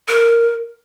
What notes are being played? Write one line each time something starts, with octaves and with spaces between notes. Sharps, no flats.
A#4